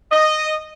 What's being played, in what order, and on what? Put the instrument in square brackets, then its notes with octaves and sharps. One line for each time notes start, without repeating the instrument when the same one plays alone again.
[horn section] D#5